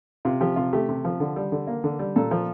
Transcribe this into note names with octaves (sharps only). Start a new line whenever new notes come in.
C3 F4
F3 G4
C3 F4
A3 G4
C3
F3
D3
G3
D3
A#3
D3
G3
A#2 A4
F3